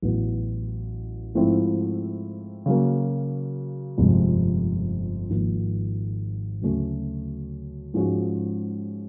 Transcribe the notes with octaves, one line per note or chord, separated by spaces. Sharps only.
A1 A2 F#3 B3
G#2 F3 A3 C4 E4
C#3 F#3 A#3
G1 F2 C3 F3 G#3
G#1 G#2 F3 A#3
D2 C#3 F#3 A3 C#4
G#2 F3 G#3 C#4 F#4